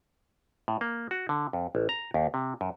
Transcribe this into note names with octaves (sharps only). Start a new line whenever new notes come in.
A2
A#3
F#4
D3
F2
A1
A#5
D#2
C3
F#2